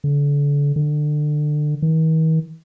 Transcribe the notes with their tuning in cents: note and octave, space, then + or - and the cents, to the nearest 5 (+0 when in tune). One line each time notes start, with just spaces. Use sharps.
D3 -35
D3 +25
D#3 +45